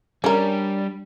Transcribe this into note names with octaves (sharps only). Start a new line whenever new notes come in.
G3 C#4 D4 A#4